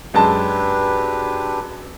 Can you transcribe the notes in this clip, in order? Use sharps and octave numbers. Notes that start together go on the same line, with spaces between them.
F#2 G#3 D4 G4 B4 A5